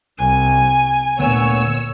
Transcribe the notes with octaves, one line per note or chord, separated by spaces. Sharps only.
C2 G#5
D2 A#2 B3 C#5 E6